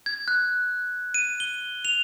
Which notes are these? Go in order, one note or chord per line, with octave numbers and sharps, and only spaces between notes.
G#6
F#6
D#7
G7
F7